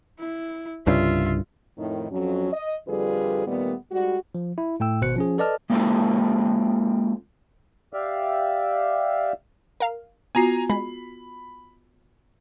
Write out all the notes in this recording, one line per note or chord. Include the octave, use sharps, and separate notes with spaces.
E4
C2 G2 C#3 F4 E5
F2 A2 D#3
F2 F#3 C#4
D#5
F2 D3 G3 F4 G#4 B4
A#2 D#3 G3 A3 B3
G#2 G3 F#4
F3
E4
A2 A3 G5 E6
G#1 B2 C5 F#6 C#7
F3 C#4 G#4
A4 B4 D5 D#5 A5 F6
G#3 A#3 C4 C#4 F4 A4
G4 D5 E5 F5
A#4 F5
B3 F4 F#4 G#5 A#5 C7
G#3 B5